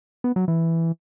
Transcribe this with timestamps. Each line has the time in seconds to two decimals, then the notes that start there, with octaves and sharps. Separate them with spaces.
0.24 B3
0.36 F#3
0.48 E3